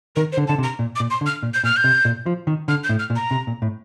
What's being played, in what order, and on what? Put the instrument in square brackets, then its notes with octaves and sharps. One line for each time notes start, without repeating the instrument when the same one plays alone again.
[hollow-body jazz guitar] D#3 [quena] A#4
[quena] C5
[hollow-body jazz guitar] D3
[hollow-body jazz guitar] D3 [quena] A5
[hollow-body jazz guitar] C3
[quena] A#5
[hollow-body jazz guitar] A#2
[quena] D6
[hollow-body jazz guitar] A#2
[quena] C6
[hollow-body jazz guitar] D3
[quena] F6
[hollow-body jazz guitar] A#2
[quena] G6
[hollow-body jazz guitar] A#2 [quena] F6
[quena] G6
[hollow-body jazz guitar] C3
A#2
F3
D#3
[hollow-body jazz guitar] D3 [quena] F6
[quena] G6
[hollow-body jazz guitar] A2
[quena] F6
[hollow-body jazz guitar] A#2
[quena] A#5
[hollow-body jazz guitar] C3
A#2
A2